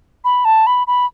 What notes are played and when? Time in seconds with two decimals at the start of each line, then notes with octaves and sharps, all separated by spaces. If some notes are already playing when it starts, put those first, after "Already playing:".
0.24 B5
0.45 A5
0.67 B5
0.87 B5